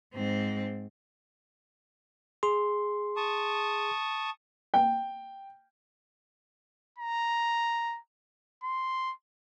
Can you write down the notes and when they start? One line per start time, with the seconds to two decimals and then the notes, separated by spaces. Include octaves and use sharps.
0.14 G#2 C4
2.43 G#4 C6
3.16 A5 C#6 D#6
4.74 G5
6.98 A#5
8.63 C6